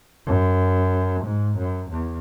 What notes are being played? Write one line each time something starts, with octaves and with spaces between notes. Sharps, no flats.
F#2
G#2
F#2
E2